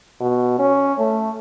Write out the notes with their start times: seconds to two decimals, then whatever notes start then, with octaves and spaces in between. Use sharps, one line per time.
0.20 B2
0.59 C#4
0.99 A3